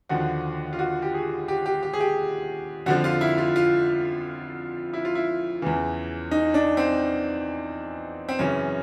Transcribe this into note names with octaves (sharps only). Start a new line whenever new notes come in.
D#2 D3 F3 F#4
F4
F#4
G4
G#4
G4
G4
G4
G#4
G4
F2 D3 F3 F#4
F4
E4
F4
F4
E4
F4
E4
E2 C#3 E3
D#4
D4
C4
C4
F#2 C#3 E3 C#4